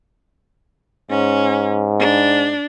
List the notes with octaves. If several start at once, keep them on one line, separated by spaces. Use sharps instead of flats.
G#2 C#4
D4